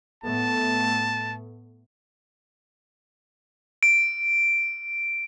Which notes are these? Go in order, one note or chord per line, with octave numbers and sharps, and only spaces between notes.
A2 A3 B3 A5
D7